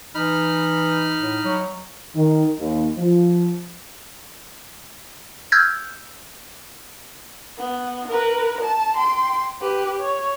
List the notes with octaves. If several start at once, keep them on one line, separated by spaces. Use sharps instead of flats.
E3 D#4 B5 F6
A2
F#3
D#3
D#2
F3
E6 F6 G6 G#6
B3
A#4 B4
A5
G5 C6
G4 B4
C#5